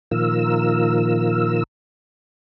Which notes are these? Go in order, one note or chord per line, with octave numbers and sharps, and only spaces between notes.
A#2 D#3 F3 F4 A#4 E6